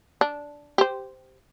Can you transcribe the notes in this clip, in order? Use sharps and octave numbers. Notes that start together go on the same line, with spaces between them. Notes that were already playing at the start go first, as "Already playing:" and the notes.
D4
G4 C5